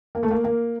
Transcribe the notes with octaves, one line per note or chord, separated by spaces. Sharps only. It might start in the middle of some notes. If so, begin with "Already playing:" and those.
A#3
A3
A#3
A#3